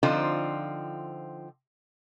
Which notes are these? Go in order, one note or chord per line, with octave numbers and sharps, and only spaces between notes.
D3 F3 C4 D#4 F4